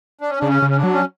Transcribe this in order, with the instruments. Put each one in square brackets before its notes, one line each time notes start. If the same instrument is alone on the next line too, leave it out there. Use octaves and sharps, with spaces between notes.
[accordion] D4
C#4
[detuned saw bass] C#3 [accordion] D4
[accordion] C#4
[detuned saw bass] C#3
[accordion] C#4
D4
[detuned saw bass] F#3
[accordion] C#4